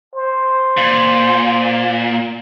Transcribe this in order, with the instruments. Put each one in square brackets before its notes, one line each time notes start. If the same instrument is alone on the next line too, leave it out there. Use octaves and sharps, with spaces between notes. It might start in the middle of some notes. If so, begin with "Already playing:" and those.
[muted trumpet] C5
[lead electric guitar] A#2